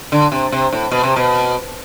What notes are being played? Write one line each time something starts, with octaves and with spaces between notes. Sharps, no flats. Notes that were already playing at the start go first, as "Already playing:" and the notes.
D3
C3
C3
A2
B2
C3
B2